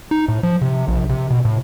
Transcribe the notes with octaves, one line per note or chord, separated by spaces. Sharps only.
D#4
A2
F3
C3
A#1
C3
B2
A2